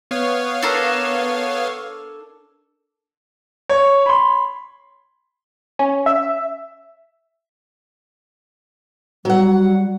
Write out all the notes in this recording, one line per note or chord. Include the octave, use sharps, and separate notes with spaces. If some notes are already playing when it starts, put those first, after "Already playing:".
B3 C#5 F5
D4 A4 A#4
C#5
B5 C6
C#4
E5
F#3 G3 F#5